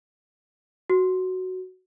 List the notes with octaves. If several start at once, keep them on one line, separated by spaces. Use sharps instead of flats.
F#4